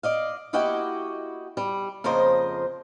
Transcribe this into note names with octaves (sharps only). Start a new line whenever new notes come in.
D5 D#5 F5
A#3 E4 F#4 G4 D#5 G5
G3
F2 C#3 F3 A#3 C5 D#5